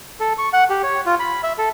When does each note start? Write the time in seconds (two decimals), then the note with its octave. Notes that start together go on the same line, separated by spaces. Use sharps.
0.20 A4
0.38 C#6
0.53 F#5
0.70 G4
0.83 C#5
1.06 F4
1.20 B5
1.43 E5
1.58 A4